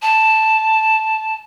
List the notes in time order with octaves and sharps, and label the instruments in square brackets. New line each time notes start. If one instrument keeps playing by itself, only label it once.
[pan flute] A5